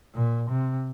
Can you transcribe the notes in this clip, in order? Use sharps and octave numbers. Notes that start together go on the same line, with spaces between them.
A#2
C3